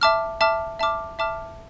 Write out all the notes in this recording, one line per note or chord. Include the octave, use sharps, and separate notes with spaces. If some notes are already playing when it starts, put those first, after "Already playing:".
E5 A5 D6 F6
E5 A5 D6 F6
E5 A5 D6 F6
E5 A5 D6 F6